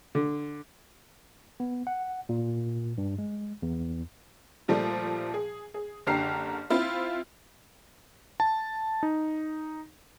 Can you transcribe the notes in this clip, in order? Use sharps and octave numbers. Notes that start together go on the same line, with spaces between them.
D3
B3
F#5
A#2
G2
G#3
E2
A#2 F3 G3 A3
G#4
G#4
F#1 D3 G4 A#5 F6 C7
C4 E4 F4 B5
A5
D#4